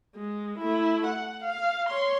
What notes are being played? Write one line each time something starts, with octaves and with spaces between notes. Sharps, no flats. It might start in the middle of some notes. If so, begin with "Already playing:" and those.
G#3
A3 E4
F#5
F5
C#5 C6